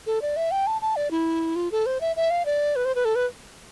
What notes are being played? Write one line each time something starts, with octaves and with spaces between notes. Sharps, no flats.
A4
D5
E5
G5
A5
A5
D5
E4
F4
A4
C5
E5
E5
F5
D5
B4
C5
B4
A4
B4